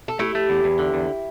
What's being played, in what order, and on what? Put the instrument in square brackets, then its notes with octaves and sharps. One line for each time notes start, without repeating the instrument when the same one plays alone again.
[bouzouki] A4
[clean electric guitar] A3 [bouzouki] E4 G4
[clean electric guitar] A3
E2
E2
D3
E2